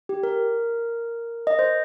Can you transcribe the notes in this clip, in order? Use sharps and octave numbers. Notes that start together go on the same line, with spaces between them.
G4
A#4
D#5
C5